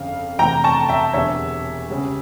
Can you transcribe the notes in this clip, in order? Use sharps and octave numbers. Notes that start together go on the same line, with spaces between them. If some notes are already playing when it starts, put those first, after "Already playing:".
Already playing: G1 F2 C#3 F5
F1 E2 E3 A3 G5 A#5
A5 C#6
E5 G5
E1 E2 D3 G3 C#5 E5
C#2 C#3 G3